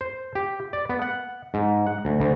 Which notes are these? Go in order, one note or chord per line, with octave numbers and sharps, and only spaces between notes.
C5
G4
D5
B3
F#5
G#2
F#5
D2
D2